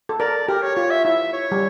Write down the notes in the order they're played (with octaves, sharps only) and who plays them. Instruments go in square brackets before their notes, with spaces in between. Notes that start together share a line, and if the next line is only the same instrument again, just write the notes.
[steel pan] A4
[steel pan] A#4 [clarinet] D5
[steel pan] G4 [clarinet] A#4
[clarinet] C#5
[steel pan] F4 [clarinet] C#5
[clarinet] E5
[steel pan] E4 [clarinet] E5
[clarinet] C#5
[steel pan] G3